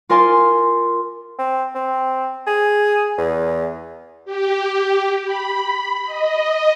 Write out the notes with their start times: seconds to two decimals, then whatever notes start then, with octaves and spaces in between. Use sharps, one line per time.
0.09 F4 A#4 D5 G#5 C6
1.39 C4
1.75 C4
2.47 G#4
3.18 E2
4.25 G4
5.25 B5
6.05 D#5